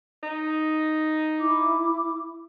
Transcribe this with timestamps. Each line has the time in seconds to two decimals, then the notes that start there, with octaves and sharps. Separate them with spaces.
0.23 D#4
1.40 E4 D6